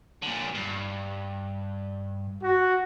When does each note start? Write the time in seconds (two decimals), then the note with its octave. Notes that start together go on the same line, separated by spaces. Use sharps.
0.23 A#2 D3
0.55 G2
2.43 F#4